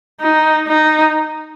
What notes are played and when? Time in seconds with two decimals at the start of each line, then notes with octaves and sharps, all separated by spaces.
0.20 D#4
0.67 D#4